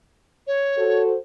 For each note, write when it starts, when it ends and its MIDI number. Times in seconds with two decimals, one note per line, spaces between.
0.47 1.03 73
0.77 1.15 66
0.77 1.15 69
0.77 1.15 72